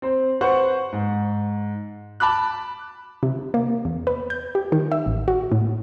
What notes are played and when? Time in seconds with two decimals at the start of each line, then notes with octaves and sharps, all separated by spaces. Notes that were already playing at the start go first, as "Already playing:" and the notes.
0.02 C4 C5
0.41 B4 C5 F#5 C#6
0.92 G#2
2.20 A5 B5 D6 F#6
3.23 C3
3.54 A#3
3.85 E2
4.07 B4
4.30 G6
4.55 G4
4.72 D#3
4.92 E5
5.06 A1
5.28 F#4
5.52 A2